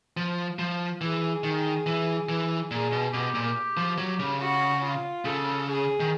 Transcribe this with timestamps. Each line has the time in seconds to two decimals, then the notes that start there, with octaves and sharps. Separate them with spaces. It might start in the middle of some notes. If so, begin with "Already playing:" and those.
0.17 F3
0.59 F3
1.01 E3 G#4
1.44 D#3
1.86 E3
2.29 E3
2.71 A#2 G#4
2.92 B2
3.13 B2 G4
3.35 A#2
3.77 F3
3.98 F#3
4.19 C#3
4.40 F#4
4.84 F4
5.25 C#3 A4
5.67 G#4
6.00 D#3